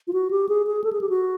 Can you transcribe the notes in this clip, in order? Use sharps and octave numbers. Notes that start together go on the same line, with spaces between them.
F4
F#4
G4
G#4
G#4
A4
G#4
G4
F#4